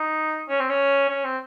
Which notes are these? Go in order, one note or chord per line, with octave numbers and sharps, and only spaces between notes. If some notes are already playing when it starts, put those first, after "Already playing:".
Already playing: D#4
C#4
C4
C#4
C#4
C4